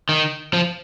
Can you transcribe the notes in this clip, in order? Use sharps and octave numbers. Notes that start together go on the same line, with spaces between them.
D#3
F3